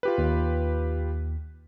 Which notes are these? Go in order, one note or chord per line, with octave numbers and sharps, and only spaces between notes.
F4 G4 B4
D#2